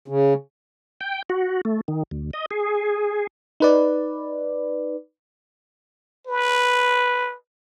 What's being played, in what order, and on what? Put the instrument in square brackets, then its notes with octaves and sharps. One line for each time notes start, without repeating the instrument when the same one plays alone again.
[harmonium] C#3
[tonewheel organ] G5
F#4
A3
D#3
D2
D#5
G#4
[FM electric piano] D#4 B4 D5
[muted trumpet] B4